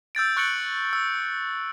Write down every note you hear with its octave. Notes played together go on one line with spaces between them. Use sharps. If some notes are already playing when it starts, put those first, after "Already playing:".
E6 G6 A6 D7
C#6 F#6 A6 C#7 D7 F#7
E6